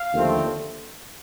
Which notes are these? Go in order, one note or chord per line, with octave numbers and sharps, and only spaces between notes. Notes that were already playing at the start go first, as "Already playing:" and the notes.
Already playing: F5
D#2 D3 F3 A3 C4